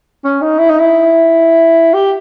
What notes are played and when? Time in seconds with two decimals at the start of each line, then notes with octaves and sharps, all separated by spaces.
0.24 C#4
0.42 D#4
0.59 E4
0.70 D#4
0.79 E4
1.94 G4